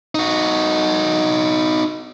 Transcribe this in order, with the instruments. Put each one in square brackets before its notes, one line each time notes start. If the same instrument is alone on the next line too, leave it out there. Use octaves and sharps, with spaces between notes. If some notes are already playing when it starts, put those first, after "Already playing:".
[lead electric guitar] D#4 F#4